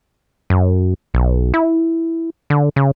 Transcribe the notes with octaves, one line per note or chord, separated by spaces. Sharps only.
F#2
B1
E4
D3
C#3